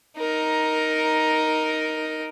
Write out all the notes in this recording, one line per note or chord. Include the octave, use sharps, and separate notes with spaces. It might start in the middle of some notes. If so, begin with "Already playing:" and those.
D#4 A#4